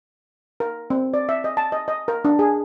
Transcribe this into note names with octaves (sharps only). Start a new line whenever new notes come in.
A#4
C4
D5
E5
D#5
A5
D#5
D#5
A#4
D4
G#4